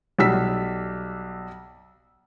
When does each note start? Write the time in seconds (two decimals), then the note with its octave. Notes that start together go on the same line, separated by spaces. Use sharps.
0.19 B1 G3 E6 B6